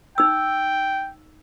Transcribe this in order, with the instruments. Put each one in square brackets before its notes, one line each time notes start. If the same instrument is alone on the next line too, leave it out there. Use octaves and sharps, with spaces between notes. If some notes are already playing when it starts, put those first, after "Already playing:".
[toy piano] D#4 E6 [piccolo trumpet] G5